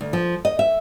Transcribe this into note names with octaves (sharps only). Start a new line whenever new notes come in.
D2
F3
D#5
E5